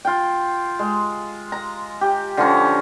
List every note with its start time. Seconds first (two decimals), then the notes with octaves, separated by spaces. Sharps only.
0.05 F4 G5
0.79 G#3
1.52 A#5
2.01 G4
2.37 D3 F3 C#4 A#5